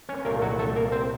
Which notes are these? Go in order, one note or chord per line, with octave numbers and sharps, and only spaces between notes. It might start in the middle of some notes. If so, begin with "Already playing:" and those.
C#4 C#5
C2 A#2 A3 A#3 A#4
F#3 F#4
A3 A4
A#3 A#4
C4 C5